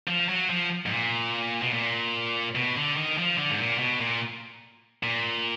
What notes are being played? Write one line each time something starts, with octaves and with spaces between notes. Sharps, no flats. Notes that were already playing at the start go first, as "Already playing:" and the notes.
F3
F#3
F3
G#2
A#2
B2
A#2
B2
D3
D#3
F3
D3
G#2
A#2
B2
A#2
A#2